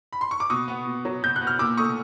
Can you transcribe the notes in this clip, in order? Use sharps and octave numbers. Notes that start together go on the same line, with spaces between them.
B5
C6
C#6
D6
B2 C#6 D#6
B3
B2
F#3
B2 G6
F#6
B3
F6
A#2 D6 E6
A3 C#6 D#6